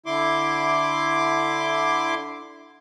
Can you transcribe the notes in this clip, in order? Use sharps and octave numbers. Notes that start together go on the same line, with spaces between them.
D3 E4 C6 D6